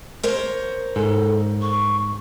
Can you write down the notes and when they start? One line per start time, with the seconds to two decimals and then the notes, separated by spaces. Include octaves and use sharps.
0.23 A#4 C5 C#5
0.96 G#2 A4
1.62 C#6